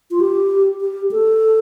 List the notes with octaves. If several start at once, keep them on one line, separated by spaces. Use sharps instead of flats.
F4
G4
G4
A4